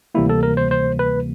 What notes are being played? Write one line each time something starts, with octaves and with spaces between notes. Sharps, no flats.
D2 C3 E3 G3 A#3 E4
A4
A#4
C5
C5
B4